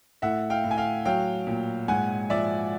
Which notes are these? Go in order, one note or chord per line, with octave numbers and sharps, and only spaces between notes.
A2 E5 F#5
F5 G5
A2
G#5
F5 G5
F#3 F5 G5
A#2
G#2 F#5 G#5
F3 D5 E5